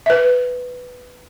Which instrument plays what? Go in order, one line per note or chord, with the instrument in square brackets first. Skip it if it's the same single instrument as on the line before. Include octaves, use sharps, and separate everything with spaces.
[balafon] B4 E5